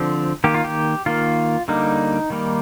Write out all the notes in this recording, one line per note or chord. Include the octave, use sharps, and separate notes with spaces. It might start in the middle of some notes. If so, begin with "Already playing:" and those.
Already playing: D3 F3 C4
D#3 A#3 G4
F4
G4
D#3 A#3 F4
D3 G3 A#3 D#4
D#3 G3 A#3